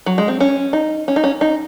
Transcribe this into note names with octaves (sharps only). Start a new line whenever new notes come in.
F#3
G#3
C4
C#4
D#4
C#4
D#4
C#4
D#4